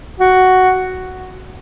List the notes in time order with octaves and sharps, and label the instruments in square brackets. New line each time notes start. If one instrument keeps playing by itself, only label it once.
[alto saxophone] F#4